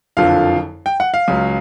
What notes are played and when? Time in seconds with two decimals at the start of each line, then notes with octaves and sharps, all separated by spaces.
0.17 F#1 F2 D3 F3 F5
0.86 G5
1.00 F#5
1.14 F5
1.28 C#2 C#3 F#3